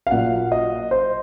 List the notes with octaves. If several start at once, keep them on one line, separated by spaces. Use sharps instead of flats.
F5
A#2 F#3 F#5
D#5
C5